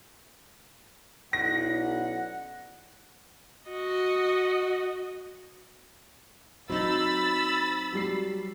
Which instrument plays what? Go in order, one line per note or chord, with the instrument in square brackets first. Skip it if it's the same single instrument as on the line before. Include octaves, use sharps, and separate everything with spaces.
[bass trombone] B1 [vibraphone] C#4 E4 D5 [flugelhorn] F#5 [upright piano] A#6
[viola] F#4 D#5
[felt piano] F#3 [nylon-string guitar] C4 D#4 [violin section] B5 E6 A6
[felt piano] F#3 G3 C7